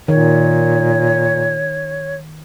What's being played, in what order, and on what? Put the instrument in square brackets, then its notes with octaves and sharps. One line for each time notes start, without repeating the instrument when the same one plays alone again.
[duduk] A#2 [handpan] D#3 [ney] C#5